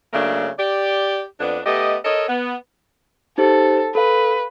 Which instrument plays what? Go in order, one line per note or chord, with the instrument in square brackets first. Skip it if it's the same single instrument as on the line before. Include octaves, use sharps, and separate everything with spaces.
[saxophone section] C#3 F#3 A3 A#3 D4
G4 D5
F2 B3 D4
A3 B3 G4 D#5
A4 A#4 C#5 D#5
B3
[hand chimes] D#4 G4 C5 [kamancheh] A4
[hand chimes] A4 F5 [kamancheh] B4